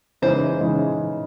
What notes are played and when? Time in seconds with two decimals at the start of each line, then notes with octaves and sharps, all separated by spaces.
0.22 C#3 E3 G#3 D#4 C5
0.61 C#3 E3 G#3 D#4